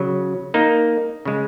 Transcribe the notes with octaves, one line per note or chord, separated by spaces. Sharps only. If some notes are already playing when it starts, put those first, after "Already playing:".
Already playing: C#3 F#3
A#3 D#4
C#3 G#3